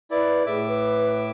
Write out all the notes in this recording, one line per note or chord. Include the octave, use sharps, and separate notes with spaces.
E4 B4 D5
A2 G#4 E5 D6
B4